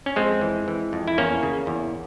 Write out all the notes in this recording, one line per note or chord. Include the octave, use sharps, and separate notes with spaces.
C#4
F2 G#3 C4
E3
E3
F2
E4
E2 A#3 C#4
C#3
E2